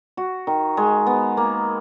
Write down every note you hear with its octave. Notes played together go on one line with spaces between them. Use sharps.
F#4
D#3
G#3
B3
A#3